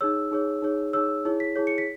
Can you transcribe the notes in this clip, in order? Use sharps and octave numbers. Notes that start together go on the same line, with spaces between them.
D#4 G#4 C#5 E6
D#4 G#4 C#5
D#4 G#4 C#5
D#4 G#4 C#5 E6
E4 G#4 C#5
B6
E4 G#4 C#5
C#7
B6